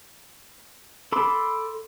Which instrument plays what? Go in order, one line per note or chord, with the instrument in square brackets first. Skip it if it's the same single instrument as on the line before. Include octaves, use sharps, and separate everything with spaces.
[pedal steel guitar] A4 B5 C6 D6